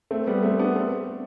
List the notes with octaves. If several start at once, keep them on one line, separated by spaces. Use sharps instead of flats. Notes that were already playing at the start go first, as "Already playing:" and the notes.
A3 C4
G3 B3
A3 C4
B3 D4
A3 C4